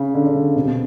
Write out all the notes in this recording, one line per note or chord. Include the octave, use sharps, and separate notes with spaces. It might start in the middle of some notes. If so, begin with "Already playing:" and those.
Already playing: C#3
D3
D3
C#3
C3
B2